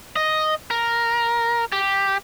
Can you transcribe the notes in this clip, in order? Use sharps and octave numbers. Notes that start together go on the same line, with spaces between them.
D#5
A#4
G4